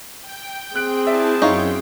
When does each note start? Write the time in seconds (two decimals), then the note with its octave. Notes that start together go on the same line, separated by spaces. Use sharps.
0.21 G5
0.75 C4 G#4 F#6 D7
1.07 E4 D5 E5 A5
1.42 F#2 D#4 E4 C#5 F5 G5 C6